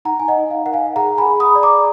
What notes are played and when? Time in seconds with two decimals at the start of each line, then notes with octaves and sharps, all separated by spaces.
0.05 D#4 F#5 A#5
0.20 G#5
0.28 D#5 F#5
0.36 D#4
0.51 F5
0.66 A#4 F#5
0.73 F5 G#5
0.96 G#4 F#5 A#5
1.18 G#5 B5
1.26 G#4
1.40 B5 D#6
1.55 D5
1.63 A#5 D6